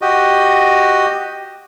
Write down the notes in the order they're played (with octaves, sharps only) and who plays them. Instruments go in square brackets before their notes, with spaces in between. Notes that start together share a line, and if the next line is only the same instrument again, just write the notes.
[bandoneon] F#4 G4 D#5